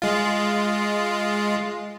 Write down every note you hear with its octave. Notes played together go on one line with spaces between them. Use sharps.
G#3 F4